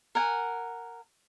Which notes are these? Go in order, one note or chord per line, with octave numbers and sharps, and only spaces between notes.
A#4 F#5 G#5